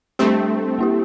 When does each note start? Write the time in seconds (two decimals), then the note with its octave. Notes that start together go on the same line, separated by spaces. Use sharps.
0.19 G3 A3 C4 D4 G4
0.79 A#3 E4 G4